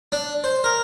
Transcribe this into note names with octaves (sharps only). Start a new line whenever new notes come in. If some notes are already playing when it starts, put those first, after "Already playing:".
D4
C5
A#4